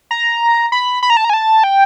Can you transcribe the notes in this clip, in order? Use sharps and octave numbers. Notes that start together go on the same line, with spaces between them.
A#5
B5
B5
A#5
A5
A#5
G#5
A5
G5